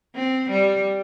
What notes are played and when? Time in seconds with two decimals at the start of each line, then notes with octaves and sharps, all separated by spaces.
0.15 C4
0.50 G3